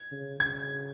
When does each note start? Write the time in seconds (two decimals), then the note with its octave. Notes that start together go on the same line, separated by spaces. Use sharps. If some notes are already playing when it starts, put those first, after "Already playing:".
Already playing: G#6
0.12 C#3
0.39 C#3 G#6